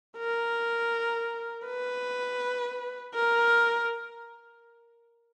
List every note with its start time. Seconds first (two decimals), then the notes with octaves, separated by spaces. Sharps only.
0.18 A#4
1.66 B4
3.14 A#4